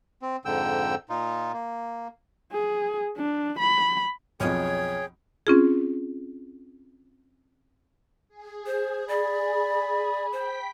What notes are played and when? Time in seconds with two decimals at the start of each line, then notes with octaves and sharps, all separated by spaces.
0.22 C4
0.45 F2 G#2 D3 G5 E6
1.10 A#2 D#4 F4
1.53 A#3
2.52 G#4
3.17 D4
3.59 B5
4.40 B1 F2 G#4 C#5 G5
5.47 C4 C#4 F4 G#4
8.29 G#4
8.66 C5
9.08 D5 B5
10.32 C5 G5 B6